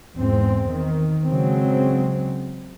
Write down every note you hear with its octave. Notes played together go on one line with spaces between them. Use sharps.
E2 G#2 C4
D#3
C#3 F#3 G#3 C4